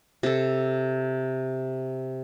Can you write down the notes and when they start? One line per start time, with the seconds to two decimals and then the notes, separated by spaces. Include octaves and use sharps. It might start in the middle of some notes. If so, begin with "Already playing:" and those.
0.23 C3 A4